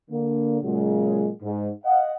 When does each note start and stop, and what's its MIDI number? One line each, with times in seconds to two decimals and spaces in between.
0.10 0.57 50
0.10 0.57 58
0.62 1.29 46
0.62 1.29 49
0.62 1.29 54
0.62 1.29 56
1.42 1.68 44
1.83 2.12 75
1.83 2.12 77
1.83 2.12 78